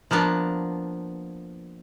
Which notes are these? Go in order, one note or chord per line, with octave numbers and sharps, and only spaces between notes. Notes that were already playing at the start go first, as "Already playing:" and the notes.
F3 A#3 B3 D4